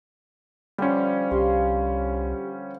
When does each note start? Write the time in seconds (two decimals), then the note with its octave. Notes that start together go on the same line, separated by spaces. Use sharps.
0.78 D3 F3 G3 C#4
1.31 C2 G4 F5 C6